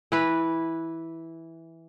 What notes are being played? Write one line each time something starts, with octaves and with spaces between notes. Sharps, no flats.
E3 B4